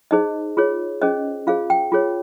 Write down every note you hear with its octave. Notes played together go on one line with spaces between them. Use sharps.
D#4 G#4 C5 D#5
F4 G#4 C#5
C#4 G#4 C5 D#5
F4 G#4 C5 F5
G5
F4 G#4 C#5